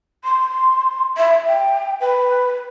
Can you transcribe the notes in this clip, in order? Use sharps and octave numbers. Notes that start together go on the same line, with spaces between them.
C6
E5
G5
B4